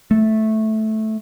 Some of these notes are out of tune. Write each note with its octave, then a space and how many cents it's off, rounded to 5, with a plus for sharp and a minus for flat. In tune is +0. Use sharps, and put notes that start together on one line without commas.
A3 -10